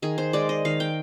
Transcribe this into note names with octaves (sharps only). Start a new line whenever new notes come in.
D#3 G#4
C5
G#3 D5
D#5
D#3 F5
G5